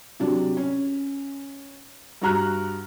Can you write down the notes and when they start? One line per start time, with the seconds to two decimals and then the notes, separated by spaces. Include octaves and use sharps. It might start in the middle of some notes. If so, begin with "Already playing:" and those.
0.20 C3 F#3 D4
0.57 C#4
2.22 G2 F#4 A#5 F6 F#6